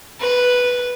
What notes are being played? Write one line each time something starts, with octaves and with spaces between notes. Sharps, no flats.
B4